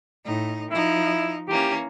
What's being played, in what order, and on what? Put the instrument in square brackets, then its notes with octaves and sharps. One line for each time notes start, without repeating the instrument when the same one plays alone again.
[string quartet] A2 D#4
[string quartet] F3 D#4 [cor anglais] E4
[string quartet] E3 A#3 C#4 [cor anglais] G4